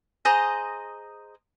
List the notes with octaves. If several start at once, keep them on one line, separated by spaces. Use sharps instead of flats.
G#4 C5 D#5 A#5